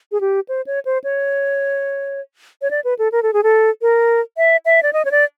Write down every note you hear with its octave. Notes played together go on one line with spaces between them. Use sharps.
G#4
G4
C5
C#5
C5
C#5
C#5
D5
B4
A4
A#4
A4
G#4
A4
A#4
E5
E5
D5
D#5
C#5
D5